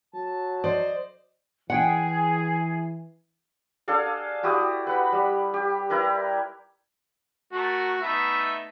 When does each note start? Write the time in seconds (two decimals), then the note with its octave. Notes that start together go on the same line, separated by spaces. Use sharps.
0.14 F#3 A5
0.64 C5 D5 D#5
1.70 E3 G#4 F#5 G5
3.88 D4 G#4 A4 F5
4.43 E4 F#4 G4 D#6
4.87 B4 F#5 B5
5.12 G3
5.54 G4
5.90 E4 A#4 B4
7.53 A3 F#4 A#4
8.01 A3 B3 D#4 E5